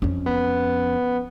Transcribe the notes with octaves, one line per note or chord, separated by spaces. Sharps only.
F2 C#4
B3